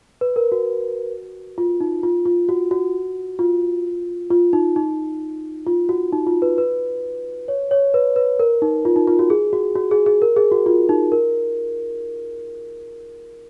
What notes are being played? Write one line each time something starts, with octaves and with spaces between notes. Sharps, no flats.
B4
A#4
F#4
F4
D#4
F4
F4
F#4
F#4
F4
F4
D#4
D#4
F4
F#4
D#4
F4
B4
B4
C#5
C#5
B4
B4
A#4
D#4
F4
D#4
F4
F#4
G#4
F#4
F#4
G#4
G#4
A#4
G#4
F#4
F4
D#4
A#4